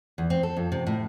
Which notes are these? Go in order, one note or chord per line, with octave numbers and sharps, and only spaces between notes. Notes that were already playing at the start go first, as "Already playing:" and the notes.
E2
C4
A4
F2
C3
A2